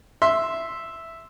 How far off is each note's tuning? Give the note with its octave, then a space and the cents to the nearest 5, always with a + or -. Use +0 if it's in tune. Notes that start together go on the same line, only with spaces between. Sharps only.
E5 +0 C6 +0